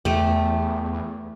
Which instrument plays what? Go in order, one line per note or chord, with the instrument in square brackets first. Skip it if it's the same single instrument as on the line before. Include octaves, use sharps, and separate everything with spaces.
[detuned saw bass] E2 [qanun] A3 G4